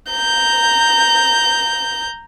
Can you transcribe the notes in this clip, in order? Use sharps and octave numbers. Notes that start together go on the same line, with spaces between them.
A#5 G6